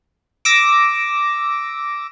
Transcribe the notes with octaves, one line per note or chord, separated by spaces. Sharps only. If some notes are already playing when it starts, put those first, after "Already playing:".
D6 E6 A#6